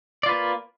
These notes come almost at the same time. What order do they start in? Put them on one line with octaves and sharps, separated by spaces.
D5 F4 B4 A#3